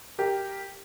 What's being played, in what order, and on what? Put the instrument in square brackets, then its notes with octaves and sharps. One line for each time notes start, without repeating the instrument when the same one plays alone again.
[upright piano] G4 A#4